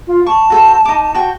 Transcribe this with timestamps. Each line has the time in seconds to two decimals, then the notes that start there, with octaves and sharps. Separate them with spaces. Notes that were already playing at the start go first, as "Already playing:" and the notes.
0.07 F4
0.26 A5 C#6
0.50 F#4 A4 C5
0.85 D#4 D6
1.15 F#4 G5 C#6